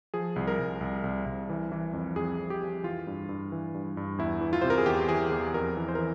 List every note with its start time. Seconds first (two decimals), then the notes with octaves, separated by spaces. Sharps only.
0.14 F3 G#4
0.36 C2
0.48 A#4
0.59 C2
0.81 C2
1.04 C2
1.26 C2
1.49 E3
1.72 E3
1.93 F2
2.16 F2 G#4
2.39 F2
2.50 G4
2.62 F2
2.83 E3 F4
3.07 G2
3.29 G2
3.52 E3
3.74 G2
3.97 G2
4.18 E2 E4
4.41 E3
4.53 F4
4.61 C3 C5
4.70 A#4
4.78 G#4
4.86 E2 G4
5.09 E3 G#4
5.32 E2 G4
5.54 F2 A#4
5.77 E3
5.88 C5
5.95 A#4
5.99 E3